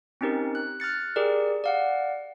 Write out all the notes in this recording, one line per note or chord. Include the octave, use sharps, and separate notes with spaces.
C4 C#4 D#4 G4 A#4
F#6
F6 F#6 A6 C#7
G4 G#4 A#4 D5
D5 F5 F#5